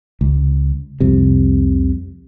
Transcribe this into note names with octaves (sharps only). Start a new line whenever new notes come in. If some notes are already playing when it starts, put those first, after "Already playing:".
C#2
C2 F2 C3